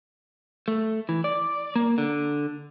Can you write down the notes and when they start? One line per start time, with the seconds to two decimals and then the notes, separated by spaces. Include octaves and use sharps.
0.68 A3
1.09 E3
1.24 D5
1.76 A#3
1.98 D3